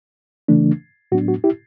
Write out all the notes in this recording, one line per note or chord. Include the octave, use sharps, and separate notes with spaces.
C#3 E3 A3 D4
A2 F#3 B3 D4 F#4
F#4
E4 G4